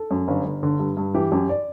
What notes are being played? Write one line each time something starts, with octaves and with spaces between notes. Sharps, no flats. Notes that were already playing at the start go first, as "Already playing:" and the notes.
Already playing: A4
F#2
G1
G1
D3
G2
G2
E3 G4
F#2 G4
D5